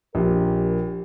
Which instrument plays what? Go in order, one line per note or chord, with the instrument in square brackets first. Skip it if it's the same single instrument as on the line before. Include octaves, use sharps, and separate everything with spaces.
[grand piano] A#1 [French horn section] G4 A#4